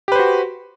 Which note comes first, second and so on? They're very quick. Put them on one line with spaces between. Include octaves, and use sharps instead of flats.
G4 B4 C5 F#4